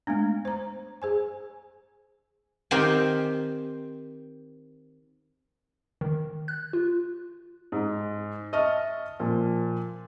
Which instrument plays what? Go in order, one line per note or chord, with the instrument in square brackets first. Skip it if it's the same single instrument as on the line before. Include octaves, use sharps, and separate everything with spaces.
[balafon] G#3 A3 B3 D4
C5 A#5
G#4 C5 G#5
[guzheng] D#3 C4 G4 C5 G5 G#5
[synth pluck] D#3
F#6
F4
[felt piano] G#2
D#5 E5 A5 C#6 F6
A#2 F3